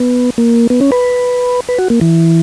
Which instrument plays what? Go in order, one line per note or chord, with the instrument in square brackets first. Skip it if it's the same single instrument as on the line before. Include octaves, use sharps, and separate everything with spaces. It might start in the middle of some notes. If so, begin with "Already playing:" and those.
Already playing: [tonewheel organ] B3
A#3
B3
C#4
B4
B4
F#4
A#3
E3